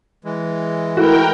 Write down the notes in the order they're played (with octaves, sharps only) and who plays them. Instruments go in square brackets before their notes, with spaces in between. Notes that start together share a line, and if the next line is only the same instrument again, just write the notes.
[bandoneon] E3 G#3
[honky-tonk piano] A3 F#4 [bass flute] E4 [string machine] A#4 G5